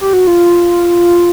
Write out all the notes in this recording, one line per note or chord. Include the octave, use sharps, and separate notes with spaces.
G4
F#4
F4